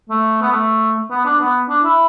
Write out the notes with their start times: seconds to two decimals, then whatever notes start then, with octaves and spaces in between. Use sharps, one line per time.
0.09 A3
0.42 B3
0.52 A3
1.10 B3
1.25 D4
1.40 B3
1.69 D4
1.84 E4